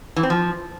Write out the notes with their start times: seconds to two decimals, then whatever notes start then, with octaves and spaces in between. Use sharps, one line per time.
0.16 E3
0.23 C4
0.30 F3